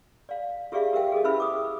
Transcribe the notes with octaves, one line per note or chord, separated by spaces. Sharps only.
D5 F5
F4 G4 G#4 D5 E5 F5
G4 A#4 E5 F5 G5
G#4 A4 D#5
C#4 E4 B4 E5 B5 E6
D6 D#6